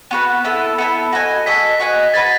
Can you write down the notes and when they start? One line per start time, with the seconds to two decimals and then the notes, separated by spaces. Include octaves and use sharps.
0.10 B3 F#4 B4 E7
0.44 B3 E4 A4 E7
0.61 D#7
0.78 B3 E4 A4 C#7
1.12 F#4 A4 D#5 G#5
1.46 F#4 A4 D#5 G#5 B6
1.80 F#4 B4 D#5 G#5
2.14 F#4 B4 D#5 G#5 A6